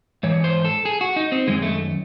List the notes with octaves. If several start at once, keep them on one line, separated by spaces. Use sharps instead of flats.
G#2 E3 C#5
C5
A4
G#4
F#4
D#4
C4
F#2 D#3 G#3
A3